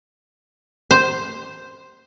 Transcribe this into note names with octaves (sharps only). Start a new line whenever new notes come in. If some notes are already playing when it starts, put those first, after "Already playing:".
C5